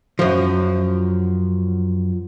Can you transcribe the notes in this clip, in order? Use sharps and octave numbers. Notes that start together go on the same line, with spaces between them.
F#2 F3